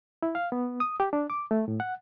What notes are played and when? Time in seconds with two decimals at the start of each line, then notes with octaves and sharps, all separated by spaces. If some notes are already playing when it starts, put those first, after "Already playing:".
0.23 E4
0.35 F5
0.52 B3
0.80 D#6
1.00 G4
1.13 D4
1.30 D6
1.51 A3
1.68 A2
1.80 F#5